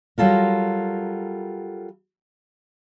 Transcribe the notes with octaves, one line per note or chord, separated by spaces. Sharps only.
F#3 G3 F4 A4 A#4